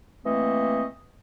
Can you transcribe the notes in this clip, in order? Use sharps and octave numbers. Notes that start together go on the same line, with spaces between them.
E3 A3 A#3 C4 D#5